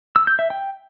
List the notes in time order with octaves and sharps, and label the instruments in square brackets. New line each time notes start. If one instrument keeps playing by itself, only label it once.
[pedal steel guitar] E6
G6
E5
G5